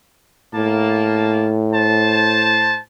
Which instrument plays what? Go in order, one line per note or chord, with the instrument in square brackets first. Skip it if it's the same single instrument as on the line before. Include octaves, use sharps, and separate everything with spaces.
[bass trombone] A2 [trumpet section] A#3 A5
[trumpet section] C5 A5